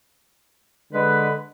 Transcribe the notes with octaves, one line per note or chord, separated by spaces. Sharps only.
D3 G#3 B4